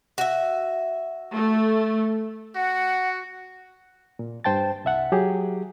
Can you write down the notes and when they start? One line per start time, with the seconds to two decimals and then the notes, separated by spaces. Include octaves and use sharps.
0.18 F#4 E5
1.31 A3
2.55 F#4 F#5
4.19 A#2
4.44 G2 C5 G5 A5 A6
4.85 C2 E5 F#5
5.12 F#3 G4 G#4